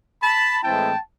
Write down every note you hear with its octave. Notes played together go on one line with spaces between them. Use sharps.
A5 B5
A2 E3 G#3 C4 E4 G5 A5